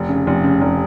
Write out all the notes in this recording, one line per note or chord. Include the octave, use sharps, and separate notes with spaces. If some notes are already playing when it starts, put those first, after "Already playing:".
Already playing: F1
C#3
F1
C#3
F1